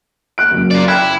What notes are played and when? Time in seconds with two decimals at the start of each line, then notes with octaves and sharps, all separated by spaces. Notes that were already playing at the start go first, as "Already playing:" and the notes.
0.38 F#6 D7
0.51 F#1 F#2
0.71 F4 D5
0.88 E4 G5 F#6 G#6